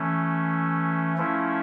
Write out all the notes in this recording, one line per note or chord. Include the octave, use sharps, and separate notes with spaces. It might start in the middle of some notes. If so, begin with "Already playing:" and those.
Already playing: E3 A3 C#4
F3 A3 C#4 E4